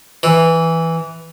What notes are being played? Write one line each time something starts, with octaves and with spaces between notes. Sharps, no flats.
E3